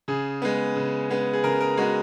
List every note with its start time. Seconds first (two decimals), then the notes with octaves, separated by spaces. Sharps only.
0.08 C#3 G#4
0.42 G#3 B3
0.76 C#3
1.10 G#3 B3
1.33 G#4
1.44 C#3 A#4
1.61 A#4
1.77 G#3 B3 F#4